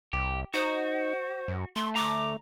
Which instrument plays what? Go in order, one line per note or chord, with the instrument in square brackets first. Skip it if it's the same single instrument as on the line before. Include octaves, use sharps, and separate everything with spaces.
[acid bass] C2 [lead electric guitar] G4
[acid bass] D#4 [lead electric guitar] F#4 [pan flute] C5
[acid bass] F#2
[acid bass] A3 [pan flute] C6
[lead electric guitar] D2 A#5 [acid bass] A3 [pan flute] D6